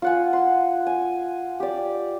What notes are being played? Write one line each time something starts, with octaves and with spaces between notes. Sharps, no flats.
F4 F#5 G#5
C6
G#5
G4 D5